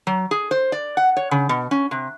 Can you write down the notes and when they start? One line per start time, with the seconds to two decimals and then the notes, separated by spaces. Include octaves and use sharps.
0.07 F#3
0.31 G#4
0.51 C5
0.72 D5
0.97 F#5
1.17 C#5
1.31 C#3
1.49 B2
1.71 C#4
1.91 C3